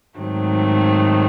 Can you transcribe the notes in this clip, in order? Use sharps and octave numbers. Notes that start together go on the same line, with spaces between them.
G#2 D#3 F#3 A3 C4